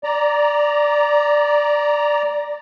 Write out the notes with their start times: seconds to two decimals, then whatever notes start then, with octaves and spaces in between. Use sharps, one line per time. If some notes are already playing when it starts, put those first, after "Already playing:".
0.04 D5 A#5